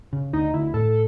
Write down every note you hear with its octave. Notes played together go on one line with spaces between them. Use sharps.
C#3
D2 D#4
D2 E4
A2 A4